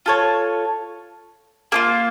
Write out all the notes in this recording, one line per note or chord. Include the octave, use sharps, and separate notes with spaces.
F4 A4 C#5
A#3 D4 F4